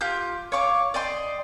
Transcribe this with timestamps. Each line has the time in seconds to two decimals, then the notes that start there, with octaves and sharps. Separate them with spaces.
0.01 F4 G4 F#6 G6
0.52 C#5 F5 C#6 D6
0.94 D5 D#5 G5 C6